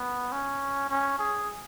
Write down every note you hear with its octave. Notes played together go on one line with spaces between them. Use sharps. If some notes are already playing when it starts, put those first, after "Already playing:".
Already playing: B3
C#4
C#4
G#4